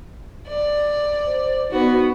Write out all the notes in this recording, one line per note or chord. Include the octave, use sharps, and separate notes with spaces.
D5
C5
B3 D#4 F#4